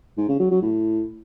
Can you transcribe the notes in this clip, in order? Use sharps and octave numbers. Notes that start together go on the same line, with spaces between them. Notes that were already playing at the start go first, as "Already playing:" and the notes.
G#2
C#3
F#3
F#3
A2